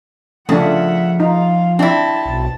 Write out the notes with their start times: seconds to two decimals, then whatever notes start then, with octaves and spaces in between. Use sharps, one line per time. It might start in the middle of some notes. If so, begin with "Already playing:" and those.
0.49 C#3 F3 A3 D4 E5 F#5
1.20 D#4 F4 F5
1.79 C4 D4 E4 A5
2.26 B1